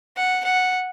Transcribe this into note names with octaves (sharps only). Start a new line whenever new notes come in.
F#5
F#5